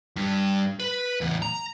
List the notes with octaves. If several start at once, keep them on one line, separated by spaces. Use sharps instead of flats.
G2
B4
E2 A2
A#5